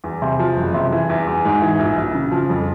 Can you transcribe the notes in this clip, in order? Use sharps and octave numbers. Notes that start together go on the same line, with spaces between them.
E2
C3
F3
F#1
C3
E3
E2
E2
G#2
E3
A#1
A#1
C#3
F3
F2